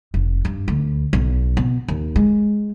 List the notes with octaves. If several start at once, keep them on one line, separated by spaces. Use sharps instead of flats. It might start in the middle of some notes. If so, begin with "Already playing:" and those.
F1
G2
D2
B1
B2
D#2
G#3